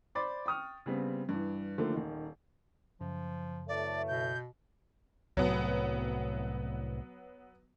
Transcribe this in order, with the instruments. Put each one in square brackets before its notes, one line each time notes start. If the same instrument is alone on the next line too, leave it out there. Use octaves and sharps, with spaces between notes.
[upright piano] C5 D5 B5 C6 D6 A6
G5 C#6 D#6 F6
C#3 G3 B3 C4
G2 E3
D3 D#3 F3 A3 A#3
D#1 D#3
[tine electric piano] F#2 C#3 [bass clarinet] F3
[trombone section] E3 F#3 A3 [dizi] D5
[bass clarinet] B2 [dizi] G6
[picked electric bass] C2 A2 [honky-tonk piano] F#3 B3